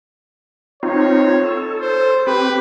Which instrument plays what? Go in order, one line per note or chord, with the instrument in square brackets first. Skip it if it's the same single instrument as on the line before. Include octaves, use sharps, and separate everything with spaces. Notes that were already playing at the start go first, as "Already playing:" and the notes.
[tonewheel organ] C4 D#4 F4 [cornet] C#5
[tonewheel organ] A4
[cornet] C5
[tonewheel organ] C4 G4 [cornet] B4